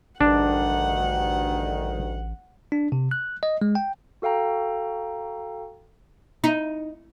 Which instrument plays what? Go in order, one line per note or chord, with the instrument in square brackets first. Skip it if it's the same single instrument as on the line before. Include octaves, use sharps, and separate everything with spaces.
[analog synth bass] A1 [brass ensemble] D2 G2 D#3 [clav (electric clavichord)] D4 [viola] F#5
[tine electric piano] D4
C3
F#6
D#5
G#3
G5
[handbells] F#4 A4 F5 G5 A#5
[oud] D#4